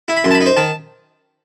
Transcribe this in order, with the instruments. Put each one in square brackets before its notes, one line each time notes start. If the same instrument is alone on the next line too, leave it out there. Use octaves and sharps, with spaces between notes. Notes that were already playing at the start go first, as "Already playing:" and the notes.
[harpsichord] E4
B5
F#2 C6
A5
B5
D#4
C5
D#3 A5